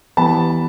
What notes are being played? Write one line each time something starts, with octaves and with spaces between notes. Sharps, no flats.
E3 G3 B3 A5 B5